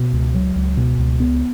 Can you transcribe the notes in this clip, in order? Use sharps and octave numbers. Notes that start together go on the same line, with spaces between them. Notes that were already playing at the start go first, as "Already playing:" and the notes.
Already playing: B2
C#2
F#3
C#2
B2
C#2
B3